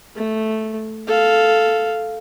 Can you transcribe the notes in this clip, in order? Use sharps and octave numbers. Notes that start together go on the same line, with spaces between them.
A3
A4 F5